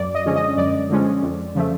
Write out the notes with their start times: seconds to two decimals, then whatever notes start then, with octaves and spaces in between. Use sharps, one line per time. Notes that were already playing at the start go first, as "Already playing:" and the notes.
Already playing: F#2 D5
0.15 D#5
0.25 D3 F3 G#3 C#4
0.36 D#5
0.57 F#2 D5
0.90 D3 F3 G#3 C#4
1.22 F2
1.55 C#3 F3 A3